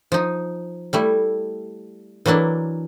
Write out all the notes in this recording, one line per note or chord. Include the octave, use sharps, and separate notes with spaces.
F3 D#4
G3 A3 E4
E3 F#3 A#3 D4 E4